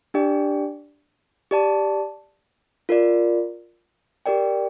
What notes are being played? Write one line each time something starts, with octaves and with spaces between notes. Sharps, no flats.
D4 G4 D5 G5
G4 D5 A5
F4 A#4 D5
G4 A#4 D5 G5